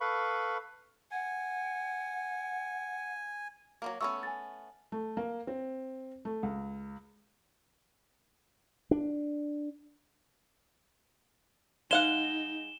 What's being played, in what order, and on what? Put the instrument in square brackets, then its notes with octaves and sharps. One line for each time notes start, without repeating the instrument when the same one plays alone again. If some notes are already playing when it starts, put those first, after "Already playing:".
[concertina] A4 B4 F5 B5 C#6
[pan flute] F#5 [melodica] G#5
[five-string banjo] F#3 G#3 A#3
[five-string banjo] A3 B3 C#4 [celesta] C#6 E6
[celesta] G#5 A6
[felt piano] A3
A#3
C4
A3
C#2
[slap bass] D4
[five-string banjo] G#3 F5 F#5 [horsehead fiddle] D#4 [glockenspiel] E7 G7